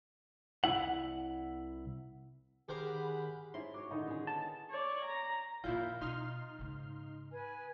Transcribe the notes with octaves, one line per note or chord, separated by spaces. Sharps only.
C2 C#3 E4 F#5
D#3 G4 G#4 A#4 C5 F#5 B5
G#2 C#4 E4 C6
F#4 C#5 D6
A2 D3 D#3 G#3 D#4 F#4
B3 G#4
A5
C#5 D5
A#5
A#2 D#3 F3 E4 F4 G6
B2 D#4 C6 F6
G#2 C#3
B4 G#5